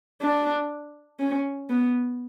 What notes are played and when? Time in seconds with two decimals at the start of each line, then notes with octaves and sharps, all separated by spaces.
0.21 D4
1.20 C#4
1.70 B3